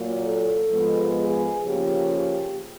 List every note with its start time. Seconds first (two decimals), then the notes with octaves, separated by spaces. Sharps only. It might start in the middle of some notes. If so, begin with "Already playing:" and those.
Already playing: A#2 F#3 A#3
0.22 A4
0.70 G#2 F3 G#3 B3
1.18 G#4
1.66 C#3 F3 A#3 G4
2.14 G4